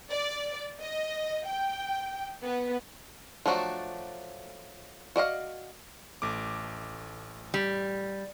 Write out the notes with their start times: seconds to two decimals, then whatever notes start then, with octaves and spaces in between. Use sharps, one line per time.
0.11 D5
0.81 D#5
1.47 G5
2.44 B3
3.46 F3 F#3 A3 D4 F#4
5.16 F#4 D5 D#5 F5
6.22 A1 A3 D6
7.54 G3